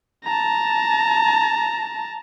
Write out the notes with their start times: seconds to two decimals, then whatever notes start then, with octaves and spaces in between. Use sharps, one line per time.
0.24 A5 A#5